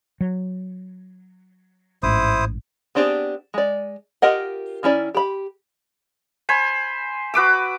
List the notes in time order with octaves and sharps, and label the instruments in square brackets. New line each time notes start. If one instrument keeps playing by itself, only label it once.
[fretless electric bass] F#3
[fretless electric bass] A1 G#2 [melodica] E4 C5 D#6
[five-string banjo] B3 C4 D4 G4 G#4
G#3 D5
F4 G4 A#4 D#5 F#5
D#3 C#4 E4 D5
G4 B5
[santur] C5 G#5 B5
F#4 B4 D6 E6